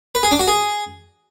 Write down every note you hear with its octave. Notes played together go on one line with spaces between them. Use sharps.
B4
G#4
D4
F#4
G#4